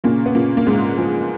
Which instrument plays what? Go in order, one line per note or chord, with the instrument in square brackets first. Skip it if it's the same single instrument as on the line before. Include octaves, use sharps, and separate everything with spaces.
[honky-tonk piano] A#2 A#3 [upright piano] C#3
[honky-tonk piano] B3
[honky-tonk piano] A#2 A#3 [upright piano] C#3
[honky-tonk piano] A#3
[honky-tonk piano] G#2 G#3 [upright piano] C#3
[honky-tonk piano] F3 [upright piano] G#3